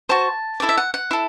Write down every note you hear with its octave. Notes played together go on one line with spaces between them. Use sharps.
F#4 C5 A5
E4 A4 D5
E5
F#5
F#5
E4 A4